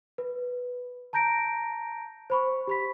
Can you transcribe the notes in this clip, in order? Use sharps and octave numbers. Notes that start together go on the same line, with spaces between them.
B4
A5 A#5 G6 A#6 D7
C5 B5 C#6
G4 B5 B6